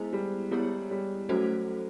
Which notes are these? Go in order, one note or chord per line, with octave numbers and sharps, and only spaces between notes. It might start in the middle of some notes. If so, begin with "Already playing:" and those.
Already playing: G#3 B3 E4 C5
G3
G3 B3 E4 G#4 C#5
G3
F#3 A3 C#4 F#4 A4 C5